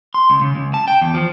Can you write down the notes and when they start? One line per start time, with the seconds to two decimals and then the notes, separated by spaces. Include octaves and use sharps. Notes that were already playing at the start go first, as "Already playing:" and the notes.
0.14 C6
0.30 C#2
0.41 C#3
0.55 C#2
0.74 A5
0.88 G5
1.01 E2
1.14 F3